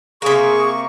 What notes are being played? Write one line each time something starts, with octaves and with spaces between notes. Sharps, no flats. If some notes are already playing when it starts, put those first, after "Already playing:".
C3 A#3 G#4 C#6